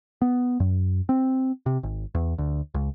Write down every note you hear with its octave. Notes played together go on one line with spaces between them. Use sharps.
B3
F#2
C4
C3
G#1
E2
D2
C#2